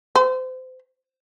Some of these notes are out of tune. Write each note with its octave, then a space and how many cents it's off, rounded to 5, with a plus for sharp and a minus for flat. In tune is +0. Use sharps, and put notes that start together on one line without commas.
C5 -30